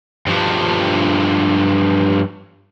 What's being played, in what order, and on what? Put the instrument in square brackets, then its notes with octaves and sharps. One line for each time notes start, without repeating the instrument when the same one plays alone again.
[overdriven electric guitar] G2 F3